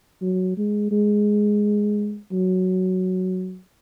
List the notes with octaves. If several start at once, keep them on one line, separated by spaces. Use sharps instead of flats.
F#3
G#3
G#3
F#3